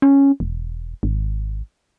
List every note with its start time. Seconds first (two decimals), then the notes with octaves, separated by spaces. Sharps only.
0.02 C#4
0.40 E1
1.03 G#1